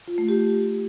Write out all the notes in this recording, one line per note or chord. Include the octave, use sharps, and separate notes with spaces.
F4
A3
G4